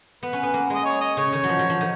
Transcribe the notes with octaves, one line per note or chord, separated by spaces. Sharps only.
B3 B4
C#4
B3
A#3
G#3 D#5
C#5
D#5
C#3 C#5
D#3
F#3
F3
F#3
F3
D#3